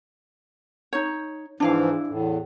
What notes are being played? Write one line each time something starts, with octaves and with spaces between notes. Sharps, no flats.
D#4 C#5
G#2 E3 F3 D4 E4 F5
E2 A2